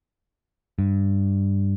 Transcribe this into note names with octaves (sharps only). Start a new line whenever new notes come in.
G2